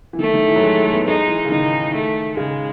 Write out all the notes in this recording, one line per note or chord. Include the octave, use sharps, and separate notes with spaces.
E3
D#3 A3
D#3
E3
F#3
G#3
B3
G#3 D#4
E3
C#3
D#3 D#4
A3
C#3 G#3